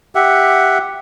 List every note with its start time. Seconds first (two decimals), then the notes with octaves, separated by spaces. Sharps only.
0.15 G4 E5 F#5